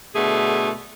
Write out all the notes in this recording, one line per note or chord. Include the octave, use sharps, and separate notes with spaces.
B2 D3 A3 G#4